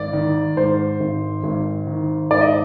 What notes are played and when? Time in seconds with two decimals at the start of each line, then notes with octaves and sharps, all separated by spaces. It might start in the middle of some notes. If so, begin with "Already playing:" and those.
Already playing: G#1 D5
0.13 D#3
0.57 G#2 C5
1.00 G#1
1.43 G#1
1.87 D#3
2.30 G#2 D5
2.41 D#5